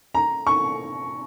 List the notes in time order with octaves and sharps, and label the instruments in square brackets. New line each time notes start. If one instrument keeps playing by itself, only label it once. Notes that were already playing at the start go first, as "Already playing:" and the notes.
[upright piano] A#5
C#6